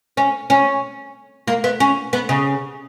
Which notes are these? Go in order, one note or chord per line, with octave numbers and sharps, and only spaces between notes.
C#4
C#4
A#3
B3
C#4
B3
C#3